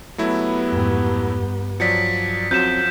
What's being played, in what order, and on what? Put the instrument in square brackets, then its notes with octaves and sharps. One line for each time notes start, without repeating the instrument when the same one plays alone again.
[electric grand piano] F#3 A3 E4 [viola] B3 G4
[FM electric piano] F2 G#2
G2
[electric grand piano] F3 F#3 D5 [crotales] B6 C#7
[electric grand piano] F#2 F3 [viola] F#3 [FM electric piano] C4 [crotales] G6 E7